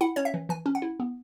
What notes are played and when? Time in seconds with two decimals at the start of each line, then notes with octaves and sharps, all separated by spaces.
0.01 E4 F#5
0.16 C#4 C#5
0.25 E5
0.34 E3
0.49 E3 G#5
0.66 C#4
0.75 F#5
0.82 E4
1.00 B3